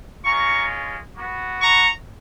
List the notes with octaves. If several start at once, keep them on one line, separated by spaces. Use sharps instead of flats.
G#3 C#4 F4 A#5 C#6
B3 F#4
A#5 C#6